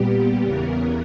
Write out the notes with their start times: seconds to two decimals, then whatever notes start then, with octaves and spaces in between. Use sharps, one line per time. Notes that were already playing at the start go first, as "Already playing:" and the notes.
Already playing: A#2 G3 B3 G4
0.41 E2 C#3 E3 B3 A#4